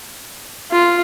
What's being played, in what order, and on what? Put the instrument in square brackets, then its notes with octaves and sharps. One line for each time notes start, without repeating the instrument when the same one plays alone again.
[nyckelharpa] F4